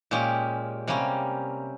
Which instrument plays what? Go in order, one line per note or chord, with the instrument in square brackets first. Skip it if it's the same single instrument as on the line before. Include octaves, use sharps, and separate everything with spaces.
[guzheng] A#2 G#3 C#4 G4
C3 G3 A#3 C#4